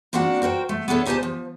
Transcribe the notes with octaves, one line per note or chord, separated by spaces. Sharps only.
A#3 C4 D4 F#4 F#5
F#4 A#4 C5 G5
A3
B3 D4 E4 G4 A4 C#5
D2 D#4 G4 C5 G#5 A5
F3